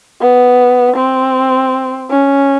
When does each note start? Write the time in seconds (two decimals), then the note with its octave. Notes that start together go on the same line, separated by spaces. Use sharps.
0.21 B3
0.96 C4
2.11 C#4